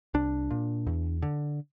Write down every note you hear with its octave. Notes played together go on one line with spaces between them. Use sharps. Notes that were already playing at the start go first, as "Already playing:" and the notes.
C2 D4
A#2
E2
D3